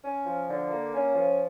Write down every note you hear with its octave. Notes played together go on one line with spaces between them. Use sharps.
C#4
F3
D3
A#3
C#4
F3